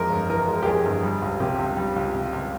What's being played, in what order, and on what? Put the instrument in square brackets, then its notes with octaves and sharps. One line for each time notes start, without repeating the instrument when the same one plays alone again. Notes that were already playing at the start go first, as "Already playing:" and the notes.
Already playing: [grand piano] F2 E3 G#3 [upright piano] A#4
[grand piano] G1
[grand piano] E3 [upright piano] A#4
[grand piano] G#3
[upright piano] G4
[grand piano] F2 [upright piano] G#4
[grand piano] G1
G3
C#2
[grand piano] C3 [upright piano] G4
[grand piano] C#2
G3
C#2
C3
C#2